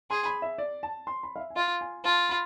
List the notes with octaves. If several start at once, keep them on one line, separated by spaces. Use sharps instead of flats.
G#4 C6
B5
E5
D5
A5
C6
B5
F5
E5
G#5
F4 F5
G#5
F4 A5
B5